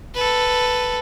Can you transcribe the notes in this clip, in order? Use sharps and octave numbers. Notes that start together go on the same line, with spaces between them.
A4 B4